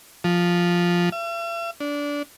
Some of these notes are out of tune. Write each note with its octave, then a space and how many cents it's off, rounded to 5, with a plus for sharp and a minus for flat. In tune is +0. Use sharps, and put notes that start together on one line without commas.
F3 +5
E5 +45
D4 -20